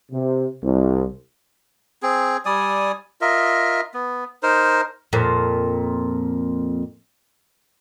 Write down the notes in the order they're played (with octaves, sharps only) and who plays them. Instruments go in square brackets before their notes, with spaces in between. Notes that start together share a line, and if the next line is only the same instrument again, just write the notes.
[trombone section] C3
C2
[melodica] C4 G#4
G3 D5 G#5 D#6
F4 A#4 D#5 E5
B3
D#4 A#4 C5
[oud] F2 A#2